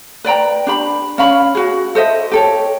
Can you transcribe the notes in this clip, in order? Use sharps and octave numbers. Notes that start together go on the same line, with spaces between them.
B4 D5 G5 A#5
D4 G4 B5
C#4 F5 B5
F#4 G#4
A4 C5 D#5 E5
G4 A4 C#5